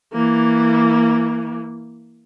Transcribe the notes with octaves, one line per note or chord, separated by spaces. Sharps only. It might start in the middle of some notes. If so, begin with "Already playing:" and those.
E3 A#3